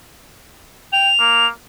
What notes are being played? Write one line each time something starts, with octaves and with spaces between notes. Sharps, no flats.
G5 F7
A#3